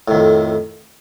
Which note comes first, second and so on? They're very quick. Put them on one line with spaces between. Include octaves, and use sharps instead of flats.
A2 D#3 F2